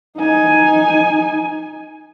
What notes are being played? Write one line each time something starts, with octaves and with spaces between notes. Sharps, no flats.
D#4 G#5